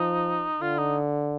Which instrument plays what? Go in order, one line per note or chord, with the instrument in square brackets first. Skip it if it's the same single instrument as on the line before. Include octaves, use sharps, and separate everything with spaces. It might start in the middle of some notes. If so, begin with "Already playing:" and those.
Already playing: [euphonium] F3 [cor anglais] D#4
[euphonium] D3 [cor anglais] F4
[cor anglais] D#4